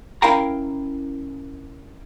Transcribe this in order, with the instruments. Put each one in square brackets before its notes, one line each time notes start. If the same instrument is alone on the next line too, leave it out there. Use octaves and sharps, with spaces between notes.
[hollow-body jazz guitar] C#4 E4 A#4 F5 G5 A#5